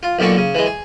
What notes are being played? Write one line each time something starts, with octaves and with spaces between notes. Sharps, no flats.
F4
B1 A#2 D3 D4 C#6
C#3
E3 G#3
G#4